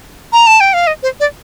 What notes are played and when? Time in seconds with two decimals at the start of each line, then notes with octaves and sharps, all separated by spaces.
0.33 A#5
0.47 A5
0.61 G5
0.73 F5
0.87 D#5
1.03 C5
1.20 D5